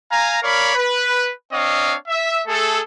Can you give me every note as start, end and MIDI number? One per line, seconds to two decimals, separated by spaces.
0.10 0.38 77
0.10 0.38 80
0.10 0.38 82
0.43 0.75 70
0.43 0.75 73
0.43 0.75 74
0.43 0.75 77
0.43 0.75 83
0.75 1.30 71
1.52 1.95 60
1.52 1.95 62
1.52 1.95 73
1.52 1.95 75
1.52 1.95 77
2.09 2.40 76
2.47 2.80 57
2.47 2.80 68
2.47 2.80 69